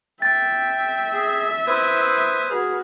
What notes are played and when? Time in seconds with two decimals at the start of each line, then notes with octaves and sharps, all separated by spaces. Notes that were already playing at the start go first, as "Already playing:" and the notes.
0.22 E5 G5 A6
1.13 G#4
1.67 E4 B4 C5 D#6
2.50 F#4 G#4 B4 F6